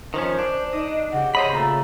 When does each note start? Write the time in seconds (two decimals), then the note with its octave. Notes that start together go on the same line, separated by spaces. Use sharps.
0.14 D#3 F3 C#4 C5
0.39 D4
0.72 D#4 D#5 D6 D#6
1.12 C#3 F#4 G4 F#5
1.35 C5 C#5 D#5 B5
1.53 A#2 A3 A#5